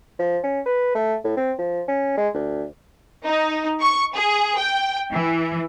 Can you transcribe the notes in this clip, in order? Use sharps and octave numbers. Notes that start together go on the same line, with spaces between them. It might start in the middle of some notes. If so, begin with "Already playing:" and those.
F3
C#4
B4
A3
A2
C4
F3
C#4
G#3
D2
D#4
C#6
G#4
G5
E3